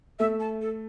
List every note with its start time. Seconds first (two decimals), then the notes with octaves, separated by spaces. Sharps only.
0.19 A3 E5
0.40 A5
0.62 A4